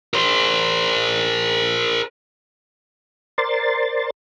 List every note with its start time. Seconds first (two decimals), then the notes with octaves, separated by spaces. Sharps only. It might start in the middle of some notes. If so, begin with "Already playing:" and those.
0.14 A#4 C5
3.38 A#4 C5 D5 C6 A6